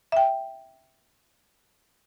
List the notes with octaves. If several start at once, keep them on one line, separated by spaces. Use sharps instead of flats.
E5 G5